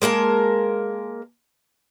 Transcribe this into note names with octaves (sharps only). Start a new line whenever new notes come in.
G#3 A#3 A#4 A5